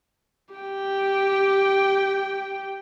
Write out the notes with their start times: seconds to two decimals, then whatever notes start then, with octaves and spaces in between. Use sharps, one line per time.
0.54 G4 G5